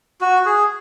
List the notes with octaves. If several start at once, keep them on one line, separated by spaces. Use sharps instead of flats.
F#4
G#4